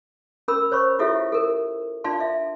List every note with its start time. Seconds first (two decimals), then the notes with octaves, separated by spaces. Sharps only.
0.48 C#4 A#4 B5 E6
0.72 C5 C#5 B5 C#6
0.99 E4 F4 G4 A4 C#5 E5
1.32 A4 A#4
2.04 D4 F4 D5 F5 A5 C6
2.20 E5